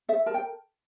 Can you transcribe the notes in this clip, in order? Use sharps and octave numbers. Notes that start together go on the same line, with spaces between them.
A4 E5
A#4 A5
G5